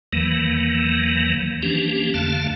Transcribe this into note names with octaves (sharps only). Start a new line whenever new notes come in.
E2 D#3 E3 F#3 A#3
E3 F3 A#3 C#4 D4 G4
F2 D3 A3 F5 A5